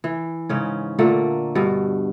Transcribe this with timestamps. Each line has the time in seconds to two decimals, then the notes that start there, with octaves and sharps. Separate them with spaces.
0.04 E3
0.50 G#2 C#3 C#4
0.99 A#2 D3 A3 A#3
1.55 G2 B2